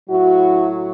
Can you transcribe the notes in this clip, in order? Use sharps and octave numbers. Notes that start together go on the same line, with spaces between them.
A2 F#3 E4 F#4